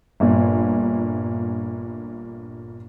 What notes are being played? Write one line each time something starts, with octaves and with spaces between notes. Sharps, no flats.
G1 A#2